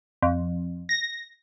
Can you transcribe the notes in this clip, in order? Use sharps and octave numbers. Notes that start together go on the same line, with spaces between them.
F2
A#6